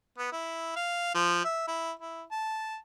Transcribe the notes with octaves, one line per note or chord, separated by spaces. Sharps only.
B3
E4
F5
F3
E5
E4
E4
A5